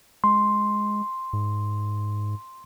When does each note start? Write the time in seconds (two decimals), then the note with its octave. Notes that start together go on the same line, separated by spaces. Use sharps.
0.24 G#3 C6
1.33 G#2